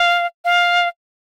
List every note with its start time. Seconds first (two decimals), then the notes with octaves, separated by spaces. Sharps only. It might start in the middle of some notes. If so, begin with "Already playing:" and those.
Already playing: F5
0.45 F5